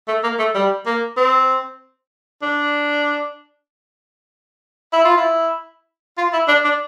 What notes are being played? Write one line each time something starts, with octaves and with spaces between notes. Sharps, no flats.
A3
A#3
A3
G3
A#3
C4
D4
E4
F4
E4
F4
E4
D4
D4